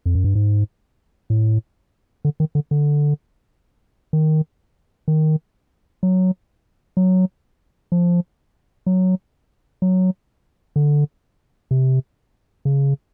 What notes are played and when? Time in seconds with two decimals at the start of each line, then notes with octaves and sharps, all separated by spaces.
0.06 F2
0.15 F#2
0.24 G2
0.35 G#2
1.30 A2
2.25 D3
2.40 D#3
2.55 D3
2.71 D3
4.13 D#3
5.08 D#3
6.03 F#3
6.97 F#3
7.92 F3
8.86 F#3
9.82 F#3
10.76 D3
11.71 C3
12.65 C#3